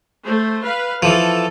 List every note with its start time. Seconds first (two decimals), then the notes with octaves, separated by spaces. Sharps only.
0.24 A3 C5
0.64 B4 F5
1.03 E3 F3 A4